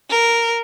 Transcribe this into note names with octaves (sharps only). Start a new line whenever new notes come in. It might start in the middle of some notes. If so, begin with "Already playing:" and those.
A#4